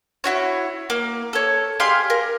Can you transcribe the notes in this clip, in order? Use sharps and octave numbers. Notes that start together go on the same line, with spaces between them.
E4 F#4 C#5
A#3
A4 C#5
G4 G#4 F5 C6
A#4